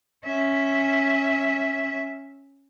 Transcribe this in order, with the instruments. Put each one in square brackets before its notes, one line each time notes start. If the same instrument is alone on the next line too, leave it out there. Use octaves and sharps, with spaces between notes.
[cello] C#4 E5